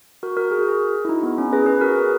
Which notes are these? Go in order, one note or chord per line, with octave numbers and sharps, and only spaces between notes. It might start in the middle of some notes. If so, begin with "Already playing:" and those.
F#4 A#4
F#4 A#4
G#4
F#4
G#4
E4
D#4
B3
C#4
G#4 B4
G#4 B4
F#4 A#4
G#4 B4